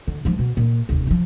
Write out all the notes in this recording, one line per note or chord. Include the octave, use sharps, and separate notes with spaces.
D3
F3 G#3
B2
A#2
F1 D#2
D#3 F3